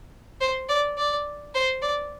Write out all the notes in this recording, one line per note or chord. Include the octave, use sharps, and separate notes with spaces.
C5
D5
D5
C5
D5